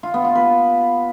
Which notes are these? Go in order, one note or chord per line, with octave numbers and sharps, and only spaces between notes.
F4
B3
F4
B4